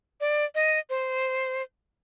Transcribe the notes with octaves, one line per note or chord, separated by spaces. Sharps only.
D5
D#5
C5